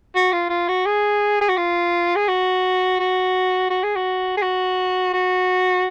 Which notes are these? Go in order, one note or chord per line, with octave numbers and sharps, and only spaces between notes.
F#4
F4
F4
F#4
G#4
G#4
F#4
F4
G#4
F#4
F#4
F#4
G#4
F#4
G#4
F#4
F#4